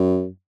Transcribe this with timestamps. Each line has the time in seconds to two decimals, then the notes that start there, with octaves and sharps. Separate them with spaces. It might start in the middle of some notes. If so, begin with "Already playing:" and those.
Already playing: F#2